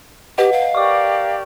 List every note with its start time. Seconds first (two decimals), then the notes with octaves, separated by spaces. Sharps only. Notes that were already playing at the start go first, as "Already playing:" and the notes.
0.38 G4 B4 D#5 F#5
0.52 F5
0.75 G4 A#4 D5 C#6 D6